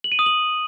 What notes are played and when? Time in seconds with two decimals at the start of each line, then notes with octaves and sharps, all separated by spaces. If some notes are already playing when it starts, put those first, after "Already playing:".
0.04 F#7
0.12 D#7
0.19 D#6
0.26 F#7